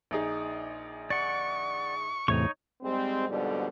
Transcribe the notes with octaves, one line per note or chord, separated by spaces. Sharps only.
A#1 D#4 G#4
D5 F#5 C#6
E2 A2 C3 D#4 C#5 C#6
G#2 G3 G#3 C4
F2 G#2 B2 D3 G3